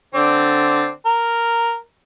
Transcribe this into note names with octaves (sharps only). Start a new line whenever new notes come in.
D3 C4 D5
A#4